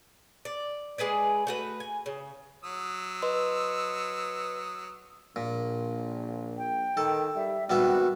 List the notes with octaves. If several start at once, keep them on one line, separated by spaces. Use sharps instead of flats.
D5
G#3 G#4 B4 D5
A3 F#4 B4
G#5
C#3
F#3 D#6 E6
B4 D#5 C6
A#1 A#2
G5
D#3 A4
G3 E5
G#1 G3 B3 F#4 E5